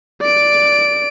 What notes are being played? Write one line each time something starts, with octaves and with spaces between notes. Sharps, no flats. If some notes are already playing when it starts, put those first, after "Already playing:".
D5 D7